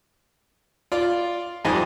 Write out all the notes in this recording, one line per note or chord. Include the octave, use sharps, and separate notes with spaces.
F4 D5
F2 G#2 G3 D#4 D#5 G#5